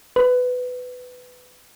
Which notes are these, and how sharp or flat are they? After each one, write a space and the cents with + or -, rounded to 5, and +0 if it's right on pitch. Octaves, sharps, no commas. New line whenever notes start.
B4 +15